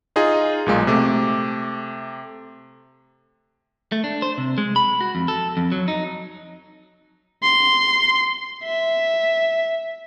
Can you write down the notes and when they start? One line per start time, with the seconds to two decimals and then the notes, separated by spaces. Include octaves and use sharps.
0.16 D#4 F4 G#4 D#5
0.66 B1 A#2 G#3
0.87 C3 A3 D6
3.92 A3
4.04 D4
4.22 C5
4.38 C3
4.58 G#3
4.76 B5
5.01 F#4
5.15 F2
5.28 A4
5.57 F2
5.72 F#3
5.88 D#4
7.43 C6
8.64 E5